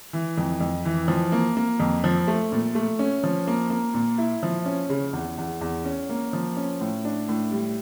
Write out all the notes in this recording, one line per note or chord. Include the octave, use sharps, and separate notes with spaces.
E3
F2
F2
E3
F3
A#3
A#3
F2
F3
A3
A#2
A3
C#4
F3
A#3
A#3
A#2
E4
F3
C#4
C#3
E2
E2
E2
C#4
A#3
F3
C#4
A2
D4
A2
G3